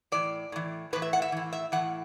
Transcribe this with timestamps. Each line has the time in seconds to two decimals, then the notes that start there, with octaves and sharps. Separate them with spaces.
0.12 A2 E3 D5
0.52 A2 E3
0.93 A2 B4
0.96 E3
1.02 E5
1.13 F#5
1.22 E5
1.32 A2 E3
1.53 E5
1.72 A2 E3 F#5